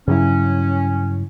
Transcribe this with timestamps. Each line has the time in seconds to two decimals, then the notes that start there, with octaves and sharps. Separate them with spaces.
0.08 G2 C#3 F#3 C#4 E4